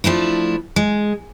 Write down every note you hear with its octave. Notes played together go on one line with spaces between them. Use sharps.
F3 A3 D4 E4
G#3